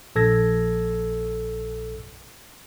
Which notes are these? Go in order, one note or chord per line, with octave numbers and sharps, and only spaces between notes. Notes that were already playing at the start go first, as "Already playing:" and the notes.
A#1 A4 E6 G#6 A#6